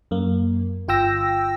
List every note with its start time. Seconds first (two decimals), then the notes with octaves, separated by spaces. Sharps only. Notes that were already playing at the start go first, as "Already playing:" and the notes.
0.11 F#2 A#3
0.88 G1 F4 G5 E6 A#6